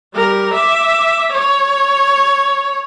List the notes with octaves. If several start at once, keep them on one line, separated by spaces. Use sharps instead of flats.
G3 A#4
E5 D6
C#5